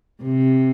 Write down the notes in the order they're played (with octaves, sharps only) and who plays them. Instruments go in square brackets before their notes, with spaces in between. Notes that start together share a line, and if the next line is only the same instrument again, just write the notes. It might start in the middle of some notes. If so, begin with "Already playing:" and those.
[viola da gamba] C3